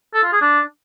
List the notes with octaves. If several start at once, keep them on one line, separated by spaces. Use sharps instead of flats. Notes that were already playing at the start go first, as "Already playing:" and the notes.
A4
F4
G#4
D4